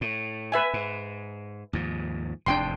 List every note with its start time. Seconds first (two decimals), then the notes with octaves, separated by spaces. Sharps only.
0.01 A2
0.52 B4 E5 G#5
0.74 G#2
1.73 D#2 G#2 F3
2.46 F1 E2 G#2 D4 G5 C6